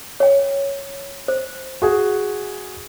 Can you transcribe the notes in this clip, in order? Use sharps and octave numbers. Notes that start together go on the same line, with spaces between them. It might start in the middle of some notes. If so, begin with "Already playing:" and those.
C#5 G5
C5
F#4 G#4